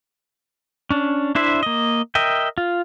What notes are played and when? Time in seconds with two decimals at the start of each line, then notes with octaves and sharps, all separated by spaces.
0.90 C#4 D4
1.35 D4 E4 C5 E5
1.63 A#3 D#5
2.15 A#4 D#5 E5 G5
2.58 F4